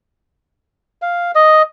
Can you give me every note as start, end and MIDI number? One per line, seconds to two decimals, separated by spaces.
1.02 1.31 77
1.35 1.62 75